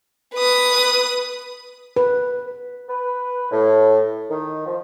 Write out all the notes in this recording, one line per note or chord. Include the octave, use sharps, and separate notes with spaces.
B4 D#6
B4
B4
A2
D#3
F3